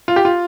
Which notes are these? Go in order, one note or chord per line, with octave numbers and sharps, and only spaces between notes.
F4
G4
F4